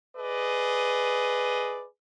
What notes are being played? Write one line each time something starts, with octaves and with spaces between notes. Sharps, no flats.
G#4 B4 D5 D#5